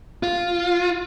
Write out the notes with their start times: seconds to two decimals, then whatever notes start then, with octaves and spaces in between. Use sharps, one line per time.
0.23 F4